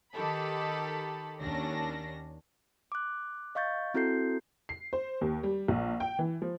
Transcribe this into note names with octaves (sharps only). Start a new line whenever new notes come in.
D#3 G4 A4 B5
D#2 C#4 D4 A#6
D6 F#6
D#5 F5 C#6 G6 A6
C4 E4 F#4 A4 G6 C7
C7
C5
D#2
G3
A#1
G5
E3
F3